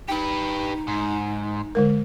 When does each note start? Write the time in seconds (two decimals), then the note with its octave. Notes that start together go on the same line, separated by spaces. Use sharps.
0.08 D#4 G4 B4
0.88 G#2
1.75 D3 G#3 A#4